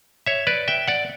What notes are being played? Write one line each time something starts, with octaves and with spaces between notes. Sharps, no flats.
C#5 E5
B4 D5
E5 G5
D5 F#5